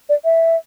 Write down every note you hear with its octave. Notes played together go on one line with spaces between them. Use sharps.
D5
E5